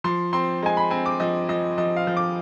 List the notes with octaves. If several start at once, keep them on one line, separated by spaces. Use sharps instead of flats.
F3 C6
C4 C6
G#3 G#5
B5
C4 G#5
D6
F3 D#5
F3 D#5
F3 D#5
F5
F3
D6